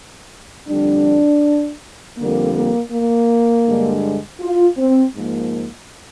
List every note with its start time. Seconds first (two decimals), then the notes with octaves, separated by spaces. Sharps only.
0.69 F2 D3 G3 D4
2.18 F2 D3 G3 A#3
2.55 A#3
2.93 A#3
3.67 G2 D3 G#3
4.41 F4
4.78 C4
5.15 G#2 F3 A#3